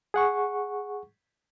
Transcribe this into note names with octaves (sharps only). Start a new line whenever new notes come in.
G#4 F#5 C#6